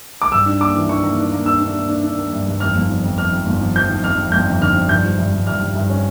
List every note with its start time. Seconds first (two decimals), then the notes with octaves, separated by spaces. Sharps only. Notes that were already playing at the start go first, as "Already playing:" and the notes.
0.22 D6
0.32 G2 E6
0.46 D4
0.61 A#3 D6
0.74 E3
0.89 D4 C#6
1.03 A#3
1.18 D4
1.31 A#3
1.46 D4 E6
1.61 D4
1.75 A#3
1.89 D4
2.04 D4
2.18 A#3
2.33 G2
2.47 G2
2.60 F2 F6
2.75 G1
2.89 F3
3.04 F2
3.18 F2 F6
3.33 F2
3.46 G1
3.61 F3
3.76 F3 G6
3.89 F3
4.03 F2 F6
4.18 F2
4.32 G1 G6
4.47 F2
4.61 D3 F6
4.75 F3
4.89 G2 G6
5.04 F3
5.18 G2
5.33 G2
5.47 G2 F6
5.61 G2
5.75 G2
5.90 C#4